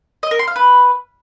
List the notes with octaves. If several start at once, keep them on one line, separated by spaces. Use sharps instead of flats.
D#5
A#4
C6
F5
B4